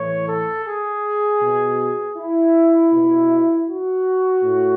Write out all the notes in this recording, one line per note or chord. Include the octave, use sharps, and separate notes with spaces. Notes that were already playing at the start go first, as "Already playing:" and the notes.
Already playing: A2 E3 C#5
A4
G#4
B2
E4
B2
F#4
A2